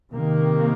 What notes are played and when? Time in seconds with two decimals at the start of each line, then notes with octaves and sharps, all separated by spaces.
0.13 C3 D#3 A#3